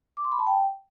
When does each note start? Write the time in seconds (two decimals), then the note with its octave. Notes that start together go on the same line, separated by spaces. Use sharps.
0.17 D6
0.24 C6
0.32 B5
0.39 A5
0.47 G5